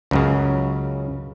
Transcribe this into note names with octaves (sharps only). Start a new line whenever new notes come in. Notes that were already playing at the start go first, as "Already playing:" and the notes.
C#2 F#2 C#3